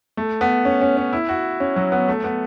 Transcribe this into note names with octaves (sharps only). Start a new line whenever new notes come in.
A3
B3
C#4
C#4
C#4
E4
F#4
C#4
F#3
B3
A3
B3